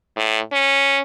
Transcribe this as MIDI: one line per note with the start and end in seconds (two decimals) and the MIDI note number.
0.16 0.39 45
0.53 1.01 61